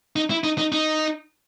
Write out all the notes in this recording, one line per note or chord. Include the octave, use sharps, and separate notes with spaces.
D#4
E4
D#4
D#4
D#4